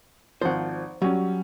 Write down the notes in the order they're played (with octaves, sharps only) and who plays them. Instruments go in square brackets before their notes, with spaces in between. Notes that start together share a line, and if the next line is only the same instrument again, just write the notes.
[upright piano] G#1 F3 [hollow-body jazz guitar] C5 F#5
[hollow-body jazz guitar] F#3 [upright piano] G3 C#4